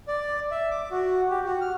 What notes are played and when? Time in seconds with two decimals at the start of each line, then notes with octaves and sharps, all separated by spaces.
0.08 D5
0.51 E5
0.71 D6
0.91 F#4
1.30 G4
1.45 F#4
1.61 F6